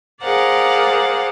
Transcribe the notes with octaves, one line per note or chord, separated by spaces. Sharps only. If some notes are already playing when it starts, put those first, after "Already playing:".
G#4 A#4 C5 D5 F5 F#5